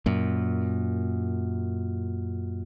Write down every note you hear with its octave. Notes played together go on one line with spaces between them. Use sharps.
F#2 A#2